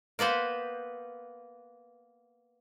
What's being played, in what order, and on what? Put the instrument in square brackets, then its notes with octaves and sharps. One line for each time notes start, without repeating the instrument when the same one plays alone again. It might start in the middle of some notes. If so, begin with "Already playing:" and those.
[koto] A#3 B3 B4 C5